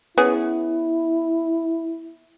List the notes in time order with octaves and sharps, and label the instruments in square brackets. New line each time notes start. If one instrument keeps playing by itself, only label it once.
[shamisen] B3 C#4 G#4 [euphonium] E4